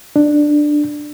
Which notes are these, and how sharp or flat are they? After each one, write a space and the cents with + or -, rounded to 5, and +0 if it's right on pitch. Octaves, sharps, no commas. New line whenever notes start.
D4 +10